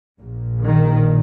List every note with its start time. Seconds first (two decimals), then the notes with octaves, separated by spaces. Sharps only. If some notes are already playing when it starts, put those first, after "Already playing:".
0.19 A#1 A#2
0.61 D#3